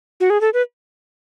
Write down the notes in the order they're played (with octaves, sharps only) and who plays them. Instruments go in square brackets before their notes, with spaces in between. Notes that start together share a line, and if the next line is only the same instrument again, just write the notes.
[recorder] F#4
G#4
A4
B4